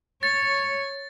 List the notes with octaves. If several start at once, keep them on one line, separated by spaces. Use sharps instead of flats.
C#5 A6